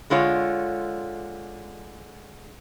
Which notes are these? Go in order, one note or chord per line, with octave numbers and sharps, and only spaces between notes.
D3 G#3 F4 C#5